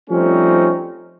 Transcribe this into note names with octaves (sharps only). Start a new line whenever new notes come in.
F3 G3 A3 C4 C#4 D#4